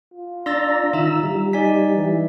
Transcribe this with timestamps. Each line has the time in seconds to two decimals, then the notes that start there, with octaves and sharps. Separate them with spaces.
0.14 F4
0.46 D4 A#5 C6 E6 A6
0.93 D#3 E5 A#5 E6
1.23 G3
1.53 D#4 D5 G#5 B6
1.95 E3